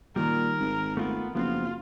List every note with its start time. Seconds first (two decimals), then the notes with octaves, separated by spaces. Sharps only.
0.16 A#2 D#3 G3 A#4
0.60 G#1
0.97 A3 B3 F4 A#4
1.35 F#1 F3 B3 C4 F4